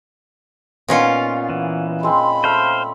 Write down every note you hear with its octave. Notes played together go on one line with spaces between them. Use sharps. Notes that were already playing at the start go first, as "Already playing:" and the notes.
A#2 B3 C#4 D#4 F4 F#5
E3
G#3 C4 B5
A3 C5 F5